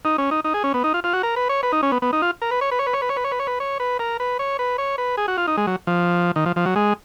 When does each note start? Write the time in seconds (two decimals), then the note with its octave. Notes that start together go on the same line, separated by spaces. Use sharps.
0.05 D#4
0.18 C#4
0.31 D#4
0.44 D#4
0.54 G#4
0.64 C#4
0.74 B3
0.84 D#4
0.94 F4
1.04 F4
1.13 F#4
1.23 A#4
1.36 B4
1.49 C#5
1.63 B4
1.72 D#4
1.83 C#4
1.92 B3
2.02 B3
2.13 D#4
2.22 F4
2.42 A#4
2.51 B4
2.61 C#5
2.71 B4
2.79 C#5
2.87 B4
2.94 C#5
3.02 B4
3.09 C#5
3.17 B4
3.24 C#5
3.32 B4
3.39 C#5
3.47 B4
3.60 C#5
3.80 B4
3.99 A#4
4.20 B4
4.39 C#5
4.59 B4
4.78 C#5
4.98 B4
5.17 G#4
5.28 F#4
5.37 F4
5.47 D#4
5.57 G#3
5.67 F#3
5.87 F3
6.36 D#3
6.46 F3
6.56 F3
6.66 F#3
6.76 G#3